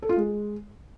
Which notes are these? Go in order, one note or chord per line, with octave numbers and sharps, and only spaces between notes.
A4
F4
G#3